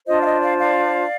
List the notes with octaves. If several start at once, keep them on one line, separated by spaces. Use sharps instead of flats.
D4 F4 C5 D#5
F5
D#5
D5 F5
D5 F5